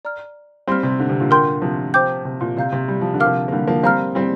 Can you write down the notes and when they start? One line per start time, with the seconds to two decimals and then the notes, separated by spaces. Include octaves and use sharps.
0.05 D5 A#5 F6
0.67 G3 C4 F5 C6 F6
0.83 C3
1.00 D3
1.09 C3
1.20 A#2 D3
1.31 A#4 G5 C6 G6
1.62 C3 F3
1.94 C5 G5 D6 G6
2.25 C3
2.41 A#2
2.57 C3 D5 F5 A#5 G6
2.72 C3
2.88 G3
3.01 F3
3.14 D3
3.20 A#4 F5 D6 F6
3.26 C3 F3
3.48 A#3
3.52 D3 G3
3.67 F3 A#3
3.83 G3 C4 F5 A#5 F6
4.15 G3 C4